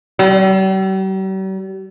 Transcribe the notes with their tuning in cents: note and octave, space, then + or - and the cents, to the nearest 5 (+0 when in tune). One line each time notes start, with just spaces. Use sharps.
G3 -45